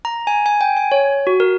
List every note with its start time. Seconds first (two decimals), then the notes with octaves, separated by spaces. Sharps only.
0.05 A#5
0.27 G#5
0.46 G#5
0.61 G5
0.77 G#5
0.92 C#5
1.27 F#4
1.40 A#4